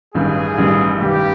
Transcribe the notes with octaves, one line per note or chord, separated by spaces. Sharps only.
A1 G2 D#3 G3 G#4
A1 G2 D#3 G3
A1 G2 D#3 G3 G4